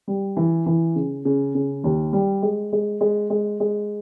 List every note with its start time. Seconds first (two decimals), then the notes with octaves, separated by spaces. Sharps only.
0.08 G3
0.37 E3
0.66 E3
0.96 C#3
1.25 C#3
1.55 C#3
1.84 D#2
2.13 G3
2.42 G#3
2.72 G#3
3.01 G#3
3.30 G#3
3.60 G#3